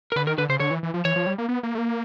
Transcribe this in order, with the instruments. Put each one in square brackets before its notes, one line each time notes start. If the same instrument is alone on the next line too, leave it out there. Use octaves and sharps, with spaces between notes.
[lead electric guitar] A#4
[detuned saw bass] D3 [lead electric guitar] B4
[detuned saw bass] D#3 [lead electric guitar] A#4
[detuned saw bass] D3 [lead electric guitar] B4
[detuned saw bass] C#3 [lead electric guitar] C5
[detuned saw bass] D3 [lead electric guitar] C#5
[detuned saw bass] E3
E3
F3
[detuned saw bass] E3 [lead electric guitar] C#5
[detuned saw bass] F3
G3
A#3
B3
A#3
A3
A#3